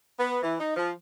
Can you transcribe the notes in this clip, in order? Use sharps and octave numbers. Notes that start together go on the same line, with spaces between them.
B3
E3
D#4
F3